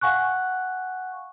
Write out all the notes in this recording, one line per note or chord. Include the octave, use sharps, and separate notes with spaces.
F5 F#5 G#5 C#6 F#6